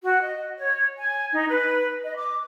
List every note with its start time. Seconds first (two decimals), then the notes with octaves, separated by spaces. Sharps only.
0.03 F#4
0.22 D#5
0.59 C#5
0.98 G#5
1.32 D#4
1.47 B4
2.04 D#5
2.16 D6